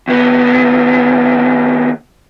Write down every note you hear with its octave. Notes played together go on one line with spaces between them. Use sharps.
D#2 B3